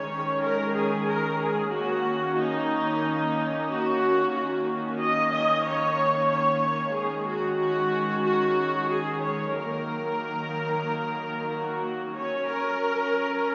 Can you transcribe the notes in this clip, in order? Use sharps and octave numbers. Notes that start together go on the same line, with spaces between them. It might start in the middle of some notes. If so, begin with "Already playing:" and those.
Already playing: D#3 G#3 C#4 C#5
A#4
G#4
A#4
G#4
D#3 A#3 C#4 F#4
D#4
F#4
D#3 A#3 C#4 F#4
D#5
D#5
C#5
C#5
D#3 G#3 C#4 G#4
F#4
F#4
F#4
G#4
C#5
D#3 F#3 A#3 A#4
F#4
F#3 C#4 C#5
A#4